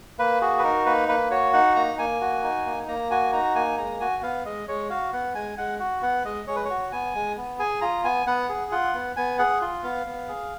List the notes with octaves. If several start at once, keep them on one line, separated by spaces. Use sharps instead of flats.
A#3 B4
F#4 G#4
B4
D#4 A#4
A#3 B4
A#3 B4
F#4 C#5
D#4 F#5
A#3 A#5
A#3 G#5
F#4
D#4
A#3
A#3 A#5
F#4 G#5
D#4 A#5
A#3 G#5
G#3 A#5
F#4 G#5
B3 F5
G#3 D#5
G#3 C#5
F#4 F5
B3 F#5
G#3 G#5
G#3 F#5
F#4 F#5
B3 F#5
G#3 D#5
G#3 C#5
B4
C#5
F#4
B3 G#5
G#3
B3
G#4 G#5
F4 A#5
B3 G#5
B3 F#5
G#4
F4 F#5
B3
B3 G#5
G#4 F#5
F4
B3 F5
B3
G#4